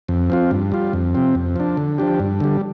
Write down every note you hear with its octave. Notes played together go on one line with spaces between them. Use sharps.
F2
F3 C4 F4
G2
G3 F4
F2
C3 F3 C4
F2
F3 D4
D3
F3 D4 G4
G2
D3 G3